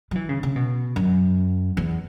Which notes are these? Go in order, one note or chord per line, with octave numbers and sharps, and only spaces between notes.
F#3
E3
C#3
C#3
B2
F#2
E2